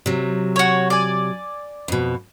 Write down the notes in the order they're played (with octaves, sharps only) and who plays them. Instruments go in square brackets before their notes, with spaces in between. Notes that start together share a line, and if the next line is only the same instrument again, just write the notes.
[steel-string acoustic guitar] C3 F#3
[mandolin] F#4 C#5
D5 G#5
[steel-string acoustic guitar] F2 B2